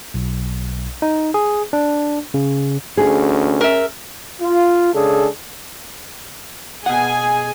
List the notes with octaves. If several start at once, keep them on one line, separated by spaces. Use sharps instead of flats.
B1
D#4
G#4
D4
C#3
D2 C#4 G#4
A#4 E5
F4
C#3 G#3 D4 G#4 A4
B2 G#4 F#5 G#5